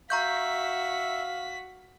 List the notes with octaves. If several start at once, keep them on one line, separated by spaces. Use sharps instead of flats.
F#4 E5 F5 A#5 C#6 G6 B6